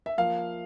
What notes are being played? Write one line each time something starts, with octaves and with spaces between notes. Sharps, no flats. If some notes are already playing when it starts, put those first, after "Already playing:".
E5
F3 A#3 F5